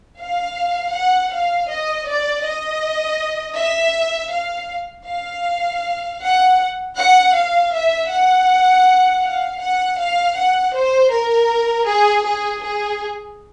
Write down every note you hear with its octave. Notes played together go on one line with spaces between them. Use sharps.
F5
F#5
F5
D#5
D5
D#5
E5
F5
F5
F#5
F#5
F5
E5
F#5
F5
F#5
F5
F#5
C5
A#4
G#4
G#4
G#4